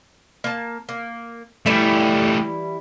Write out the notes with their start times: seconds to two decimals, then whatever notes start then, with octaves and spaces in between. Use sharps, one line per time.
0.44 A#3 A5
0.89 A#3
1.66 E3 G3 A3 E4 G4